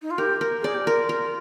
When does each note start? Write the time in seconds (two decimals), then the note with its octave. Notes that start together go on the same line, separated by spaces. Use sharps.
0.02 D#4
0.10 F4
0.18 G4 A#4
0.41 A#4
0.60 G#4 D5
0.74 G4
0.87 F4 A#4
1.09 A#4